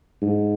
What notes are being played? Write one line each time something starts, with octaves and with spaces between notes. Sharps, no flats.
G#2